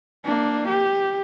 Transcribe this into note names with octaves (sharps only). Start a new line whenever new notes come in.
A#3 D4
G4